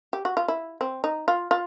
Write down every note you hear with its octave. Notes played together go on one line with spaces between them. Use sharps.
G4
F#4
F4
E4
C4
D#4
F4
F4